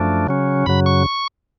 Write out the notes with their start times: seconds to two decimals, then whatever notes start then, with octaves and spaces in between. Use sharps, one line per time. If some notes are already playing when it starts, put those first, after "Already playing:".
Already playing: F#2 F3 A3 D4
0.27 C#3 F#3 C#4
0.66 F#2 C#3 F#3 B5
0.86 C#6